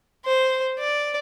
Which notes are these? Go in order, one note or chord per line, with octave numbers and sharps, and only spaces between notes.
C5
D5